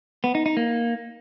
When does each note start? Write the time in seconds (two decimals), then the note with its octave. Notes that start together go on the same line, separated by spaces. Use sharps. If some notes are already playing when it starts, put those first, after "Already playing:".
0.24 B3
0.35 D#4
0.46 D#4
0.57 A#3